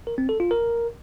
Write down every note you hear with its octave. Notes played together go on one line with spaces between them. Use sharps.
A#4
C4
A4
F4
A#4